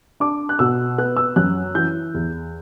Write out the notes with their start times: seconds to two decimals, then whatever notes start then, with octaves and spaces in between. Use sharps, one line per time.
0.20 D4 D6
0.49 F#6
0.59 B2 E6
0.98 B3 F#6
1.17 E6
1.36 F#2 F#6
1.75 E3 G6
2.14 E2